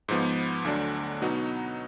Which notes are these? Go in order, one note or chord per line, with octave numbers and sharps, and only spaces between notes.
G#2 F3 B3
D2 D3 F#3 D4
B2 F#3 B3 D#4 F#4